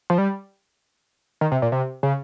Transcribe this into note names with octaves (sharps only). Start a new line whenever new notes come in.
F3
G3
D#3
C3
A#2
C3
C#3